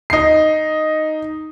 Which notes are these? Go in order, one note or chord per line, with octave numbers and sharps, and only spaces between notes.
D#4 C7